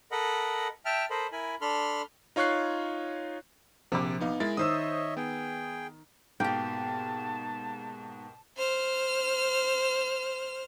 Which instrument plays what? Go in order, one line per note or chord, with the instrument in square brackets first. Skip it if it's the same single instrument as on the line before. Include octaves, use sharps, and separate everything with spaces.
[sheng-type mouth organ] A4 A#4 D#5 F#5 B5
E5 G5 A5 F6
A4 A#4 C5 D#5 B5
E4 A#4 G#5 B5
D4 A4 B5 C6 F6
[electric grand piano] D#4 F4 C#5 C#6 F#6 C7
[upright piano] A#1 D6 [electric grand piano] C3
[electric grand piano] B3 D#4 F5
[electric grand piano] G#3 E4 A#4 [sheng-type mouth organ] G#4 [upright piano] A6
[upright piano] D#3 E6 [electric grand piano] C5 D#6 [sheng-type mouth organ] C#5 D#5 E5
[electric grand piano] B3 [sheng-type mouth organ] G#4 G5
[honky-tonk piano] G#2 B2 [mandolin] A#3 G4 [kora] G5 [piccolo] A5
[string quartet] C5 F6